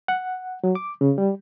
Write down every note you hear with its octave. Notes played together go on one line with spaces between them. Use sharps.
F#5
F#3
D6
C#3
G3